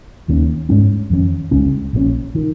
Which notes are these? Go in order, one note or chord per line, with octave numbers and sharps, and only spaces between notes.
D#2 D#3 A#3 C#4
G#2 G#3 C#4
F2 D#3 C#4
C#2 C#3 G#3 C#4
A#1 A#2 F3 C#4
D#3